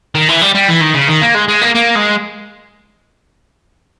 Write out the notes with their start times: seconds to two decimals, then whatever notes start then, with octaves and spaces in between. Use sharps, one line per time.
0.15 D#3
0.28 E3
0.42 G3
0.55 G3
0.69 E3
0.81 D#3
0.95 C#3
1.08 D#3
1.22 A#3
1.35 G#3
1.48 G#3
1.62 A#3
1.75 A#3
1.95 G#3